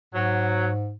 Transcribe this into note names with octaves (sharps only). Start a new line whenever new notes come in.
G#2 F#3